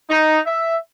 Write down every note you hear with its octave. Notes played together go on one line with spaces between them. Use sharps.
D#4
E5